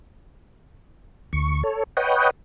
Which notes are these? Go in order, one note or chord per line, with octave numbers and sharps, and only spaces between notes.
D2 C#6
A4 C#5
B4 C#5 D#5 F#5 G5